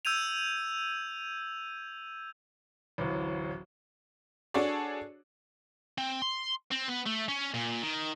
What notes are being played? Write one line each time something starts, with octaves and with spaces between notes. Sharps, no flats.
E6 G6 G#6 D#7 F7
D1 A1
D4 F#4 G#4 A4 C#5 D5
C4
C6
C4
B3
A3
C#4
A#2
D#3